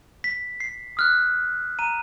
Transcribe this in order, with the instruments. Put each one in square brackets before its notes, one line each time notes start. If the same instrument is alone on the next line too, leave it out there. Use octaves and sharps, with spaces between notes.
[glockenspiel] B6
C7
D#6 F6 F#6
A#5 D#7